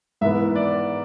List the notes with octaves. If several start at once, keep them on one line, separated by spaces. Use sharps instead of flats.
G#2 E3 B3 E5
D5